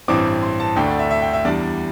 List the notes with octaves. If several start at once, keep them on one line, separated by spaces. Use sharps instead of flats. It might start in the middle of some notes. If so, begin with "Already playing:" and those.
A1 G2 E3 C4 D6
C6
A5
D2 D3 A3 D4 G5
D5
E5
E5
G5
E5
E2 E3 G3 D4 D5